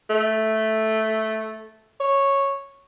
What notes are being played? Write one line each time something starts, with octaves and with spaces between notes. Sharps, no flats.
A3
C#5